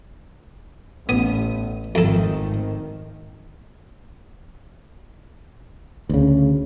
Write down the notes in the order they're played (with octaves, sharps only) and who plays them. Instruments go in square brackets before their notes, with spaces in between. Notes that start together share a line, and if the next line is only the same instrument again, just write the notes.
[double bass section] A1 [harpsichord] B3 D#6
[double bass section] G#1 A2 D#3 [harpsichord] F2 A4
[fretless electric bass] D2 C#3